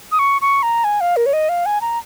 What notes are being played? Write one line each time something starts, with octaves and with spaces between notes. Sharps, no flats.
D#6
C#6
C#6
A#5
G#5
F5
A#4
C#5
D#5
F5
G#5
A#5